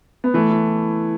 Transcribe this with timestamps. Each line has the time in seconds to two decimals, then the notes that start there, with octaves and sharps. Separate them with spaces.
0.24 B3
0.34 E3 A3 E4
0.50 E4